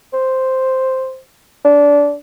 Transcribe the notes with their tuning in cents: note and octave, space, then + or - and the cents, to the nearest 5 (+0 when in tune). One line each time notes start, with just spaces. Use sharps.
C5 +0
D4 -20